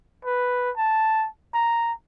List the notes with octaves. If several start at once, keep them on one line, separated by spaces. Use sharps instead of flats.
B4
A5
A#5